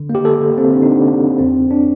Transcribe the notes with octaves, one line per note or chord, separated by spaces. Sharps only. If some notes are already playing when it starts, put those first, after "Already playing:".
Already playing: D3
A#3
G4
A4
D3
C4
D3 D4
D#4
D4
D3 D4
F2 C4
D3 D4